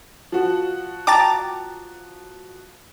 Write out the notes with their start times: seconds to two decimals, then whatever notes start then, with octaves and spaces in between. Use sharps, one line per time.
0.32 F3 F#4
1.07 G5 A5 A#5 D6 A6